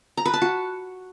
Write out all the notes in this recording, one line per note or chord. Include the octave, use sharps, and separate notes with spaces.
A#5
B4
A5
F#4